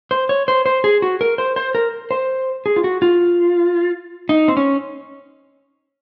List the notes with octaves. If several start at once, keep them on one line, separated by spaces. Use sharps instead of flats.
C5
C#5
C5
C5
G#4
F#4
A#4
C5
C5
A#4
C5
G#4
F4
F#4
F4
D#4
C4
C#4